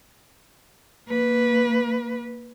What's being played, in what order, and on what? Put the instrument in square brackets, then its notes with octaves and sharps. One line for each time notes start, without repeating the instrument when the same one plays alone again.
[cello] A#3 B4